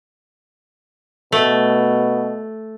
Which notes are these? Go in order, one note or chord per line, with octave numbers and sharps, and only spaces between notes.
B2 A3